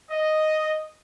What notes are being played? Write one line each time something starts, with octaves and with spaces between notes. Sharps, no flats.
D#5